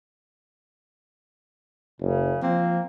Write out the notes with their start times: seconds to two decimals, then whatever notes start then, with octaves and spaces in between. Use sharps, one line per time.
2.01 F#1 C#3
2.42 F3 A#3 C4